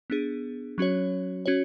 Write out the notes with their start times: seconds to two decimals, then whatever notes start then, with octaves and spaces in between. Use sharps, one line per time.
0.10 B3 D4 G#4
0.78 F#3 C#4 F#4 C#5
1.46 C#4 F#4 C#5